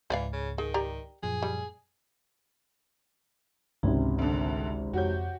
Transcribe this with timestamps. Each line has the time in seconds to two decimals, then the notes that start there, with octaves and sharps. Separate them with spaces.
0.10 C#2 G#2 E3 B4 D5 F5
0.33 C#3
0.58 D#3 G#4
0.74 G4 D5 A#5
1.23 F#2 A#2 F3 G#4
1.43 G3
3.83 G#1 C#2 G#2 C3 C#4
4.18 D2 D3
4.93 F2 F#4 G4 C#5 G6